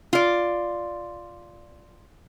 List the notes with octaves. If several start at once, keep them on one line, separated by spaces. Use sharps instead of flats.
F4 D5